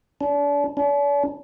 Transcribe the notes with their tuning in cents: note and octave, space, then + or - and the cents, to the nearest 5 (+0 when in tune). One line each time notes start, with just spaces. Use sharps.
D4 -35
D4 -45